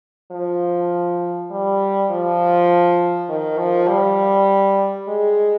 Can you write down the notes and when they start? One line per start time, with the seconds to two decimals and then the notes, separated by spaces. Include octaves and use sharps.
0.32 F3
1.51 G3
2.10 F3
3.29 D#3
3.58 F3
3.88 G3
5.08 G#3